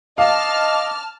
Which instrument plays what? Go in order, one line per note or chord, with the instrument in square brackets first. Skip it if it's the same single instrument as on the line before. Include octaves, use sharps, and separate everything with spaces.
[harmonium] D#5 [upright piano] F5 [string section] A5 F6 [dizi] D6